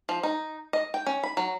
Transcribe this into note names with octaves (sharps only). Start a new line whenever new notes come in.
F3
D#4
D#5
G5
C#4
B5
F#3